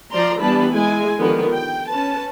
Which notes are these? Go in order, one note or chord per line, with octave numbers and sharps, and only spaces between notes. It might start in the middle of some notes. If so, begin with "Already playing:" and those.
F3 C5 D5 A#5 C6
E3 G3 B3 D4 A5 B5
G#3 E4 G#5
D3 D#3 F3 B3 G4 A#4
G5
C#4 B4 A5